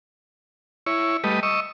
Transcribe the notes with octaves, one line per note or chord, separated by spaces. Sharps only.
E4 C#5
G3 A3 B4 D#5
D#5 C#6 E6